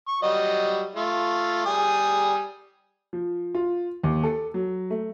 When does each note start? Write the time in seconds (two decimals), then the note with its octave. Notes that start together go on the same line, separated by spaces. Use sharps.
0.08 C#6
0.22 F#3 G3 D#5
0.95 A3 F4
1.66 G3 G#5 D#6
3.13 F3
3.55 F4
4.04 D#2
4.23 A4
4.54 F#3
4.90 A3